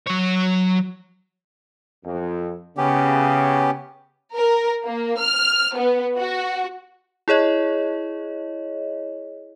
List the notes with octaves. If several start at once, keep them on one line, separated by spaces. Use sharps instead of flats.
F#3 C#5
F2
C#3 B3 C#4 G4
A#4
A#3
F6
B3
F#4
E4 G#4 C#5 D#5